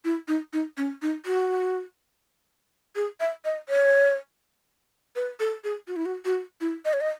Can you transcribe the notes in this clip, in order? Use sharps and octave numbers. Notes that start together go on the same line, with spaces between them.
E4
D#4
D#4
C#4
D#4
F#4
G#4
E5
D#5
C#5
B4
A4
G#4
F#4
E4
F#4
F#4
E4
D#5
C#5
D#5